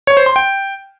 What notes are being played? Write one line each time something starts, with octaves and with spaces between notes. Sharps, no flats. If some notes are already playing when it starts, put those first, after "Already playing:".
C#5
C5
C6
G5